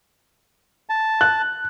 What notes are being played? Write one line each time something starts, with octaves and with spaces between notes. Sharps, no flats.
A5
F#6